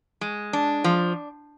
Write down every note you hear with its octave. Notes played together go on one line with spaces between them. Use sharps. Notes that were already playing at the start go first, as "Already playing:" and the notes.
G#3
D4
F3